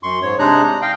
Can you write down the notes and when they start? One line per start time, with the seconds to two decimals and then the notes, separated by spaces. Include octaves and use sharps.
0.03 F#2 C6 C#6
0.22 G#2 C#5
0.39 C3 G#3 D4 D#4 A#5 F#6
0.63 A#5
0.82 D#5 F5 G5